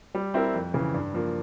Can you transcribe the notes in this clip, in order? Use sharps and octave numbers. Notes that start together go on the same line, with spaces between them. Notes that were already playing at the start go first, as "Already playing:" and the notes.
G3
C4 E4 A#4
F2
C#3 E3
G2
F3 A#3